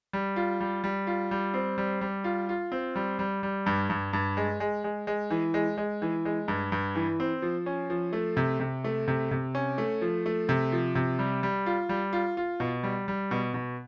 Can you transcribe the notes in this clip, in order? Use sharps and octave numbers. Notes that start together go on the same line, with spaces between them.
G3
F4
G3
G3
F4
G3
C4
G3
G3
F4
F4
C4
G3
G3
G3
G2
G2
G2
G#3
G#3
G#3
G#3
E3
G#3
G#3
E3
G#3
G2
G2
E3
C4
F3
C#4
F3
A3
C3
C3
A3
C3
C3
C#4
A3
F3
A3
C3
F3
C3
G3
G3
F4
G3
F4
F4
B2
G3
G3
B2
B2